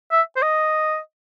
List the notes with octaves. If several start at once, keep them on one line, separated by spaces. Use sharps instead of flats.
E5
C5
D#5